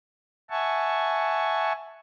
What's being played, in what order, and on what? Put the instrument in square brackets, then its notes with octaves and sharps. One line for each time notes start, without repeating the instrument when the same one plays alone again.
[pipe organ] E5 F#5 G#5 A5 C#6